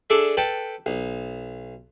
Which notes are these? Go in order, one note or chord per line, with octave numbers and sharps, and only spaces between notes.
D4 G#4 A4 D5 E5
A4 B4 G5 A5
B1